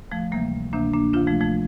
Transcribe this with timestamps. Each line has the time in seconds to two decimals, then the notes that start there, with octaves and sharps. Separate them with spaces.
0.12 F3 A3
0.32 D2 C3 E3 G3 A#3
0.73 D2 C3 E3 A#3 D4
0.93 A#3 D4
1.13 D2 C3 E3 D4 F4
1.27 F3 A3
1.41 F3 A3